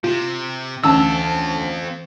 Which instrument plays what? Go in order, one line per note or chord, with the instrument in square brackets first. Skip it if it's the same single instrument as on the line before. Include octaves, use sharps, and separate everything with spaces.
[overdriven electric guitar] C3 [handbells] F4
[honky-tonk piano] D2 C#4 A5 [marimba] E3 [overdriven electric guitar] C4 F4 [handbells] E6